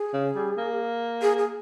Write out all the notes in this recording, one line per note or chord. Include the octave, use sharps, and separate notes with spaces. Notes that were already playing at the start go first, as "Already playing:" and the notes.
Already playing: G#4
C#3
G3
A#3
G#4
G#4